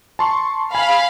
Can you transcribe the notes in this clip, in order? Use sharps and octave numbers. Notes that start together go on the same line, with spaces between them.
A5 C6 C#6
F5 G#5 B5